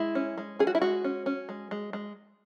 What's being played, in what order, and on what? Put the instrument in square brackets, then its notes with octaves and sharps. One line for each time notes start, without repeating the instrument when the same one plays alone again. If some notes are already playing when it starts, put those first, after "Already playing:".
Already playing: [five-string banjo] G#3 E4
C#4
G#3
C#4 G#4
F#4
E4
G#3 F#4
C#4
C#4
G#3
G#3
G#3